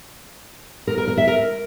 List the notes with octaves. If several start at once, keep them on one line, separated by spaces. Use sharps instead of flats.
A#4
A#4
A#4
E5
A#4